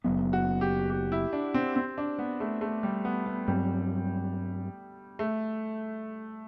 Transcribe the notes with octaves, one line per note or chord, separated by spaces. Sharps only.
F#1 F#2 F#3 B3
F#4
G4
G4
E4
D4
C4
C4
D4
B3
A3
A3
G3
B3
B3
G2 F#3 G3 C4
A3